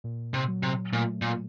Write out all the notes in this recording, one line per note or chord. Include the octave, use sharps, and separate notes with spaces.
A#2
C3
F#3
C3
A#2 A3
A#2